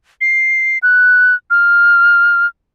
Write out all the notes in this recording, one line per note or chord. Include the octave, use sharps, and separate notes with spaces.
C7
F#6
F6